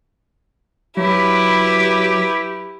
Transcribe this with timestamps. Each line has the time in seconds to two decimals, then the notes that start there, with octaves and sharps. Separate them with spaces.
0.97 F#3 E4 G4 B4